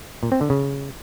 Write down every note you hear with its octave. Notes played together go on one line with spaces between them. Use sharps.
A#2
C4
D3
C#3